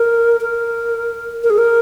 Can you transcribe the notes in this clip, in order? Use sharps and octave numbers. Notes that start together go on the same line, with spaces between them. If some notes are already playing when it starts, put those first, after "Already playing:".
Already playing: A#4
A#4
A#4
G#4
A#4